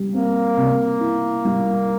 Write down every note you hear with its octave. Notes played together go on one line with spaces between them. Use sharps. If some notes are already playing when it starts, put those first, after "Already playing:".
Already playing: G3
A#3 C4
C3
E4
G3